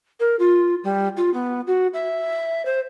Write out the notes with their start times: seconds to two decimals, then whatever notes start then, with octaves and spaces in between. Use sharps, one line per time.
0.20 A#4
0.39 F4
0.84 G3
1.17 F4
1.34 B3
1.67 F#4
1.94 E5
2.66 C5